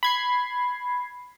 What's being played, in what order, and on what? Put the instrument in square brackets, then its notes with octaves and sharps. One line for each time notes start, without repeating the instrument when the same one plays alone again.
[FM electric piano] B5 G#6 C7